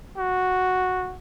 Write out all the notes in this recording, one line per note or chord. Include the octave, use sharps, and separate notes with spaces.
F#4